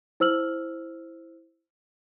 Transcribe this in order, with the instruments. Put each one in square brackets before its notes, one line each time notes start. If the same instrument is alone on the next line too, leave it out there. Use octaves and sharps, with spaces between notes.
[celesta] E4 C5 E6 F6 F#7